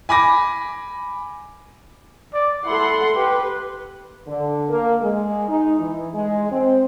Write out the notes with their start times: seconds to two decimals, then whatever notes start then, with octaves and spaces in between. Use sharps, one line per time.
0.09 G#5 B5 D6 A#6
2.33 D5
2.65 E4 A4 F#5 C6
3.15 G4 B4
4.27 D3
4.69 A#3
5.02 G#3
5.49 D#4
5.80 E3
6.14 G#3
6.51 C4